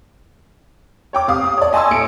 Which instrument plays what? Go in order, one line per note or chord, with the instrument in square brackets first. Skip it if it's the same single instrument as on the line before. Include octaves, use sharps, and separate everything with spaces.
[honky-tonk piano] C#5 G5 D6
C3 F5 D#6
D#6
C#5 D5
D#5 G#5 A5 C6 C#6 E6
A2 A3 C#7 D7